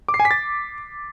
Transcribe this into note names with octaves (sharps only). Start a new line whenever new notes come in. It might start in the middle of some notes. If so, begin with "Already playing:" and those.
D6
C7
G#5
B6
A6